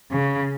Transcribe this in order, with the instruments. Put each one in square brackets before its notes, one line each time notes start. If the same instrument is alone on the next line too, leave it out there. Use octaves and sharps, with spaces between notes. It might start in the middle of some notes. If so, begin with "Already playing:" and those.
[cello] C#3